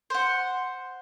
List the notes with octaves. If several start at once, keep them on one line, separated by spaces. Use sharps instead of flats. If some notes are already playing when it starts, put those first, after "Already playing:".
C5 F#5